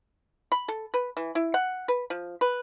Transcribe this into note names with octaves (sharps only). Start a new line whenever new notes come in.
B5
A4
B4
E3
E4
F#5
B4
F3
B4